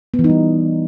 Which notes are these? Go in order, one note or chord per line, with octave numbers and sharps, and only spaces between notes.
B3
E3
D#4
G3